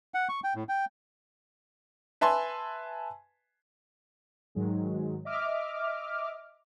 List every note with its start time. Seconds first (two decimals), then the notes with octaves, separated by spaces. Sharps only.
0.14 F#5
0.29 C#6
0.44 G5
0.55 A2
0.69 G5
2.21 B4 E5 G#5 A5 C6
4.55 G#2 D#3 F#3 G#3
5.25 D#5 E5 D6 F6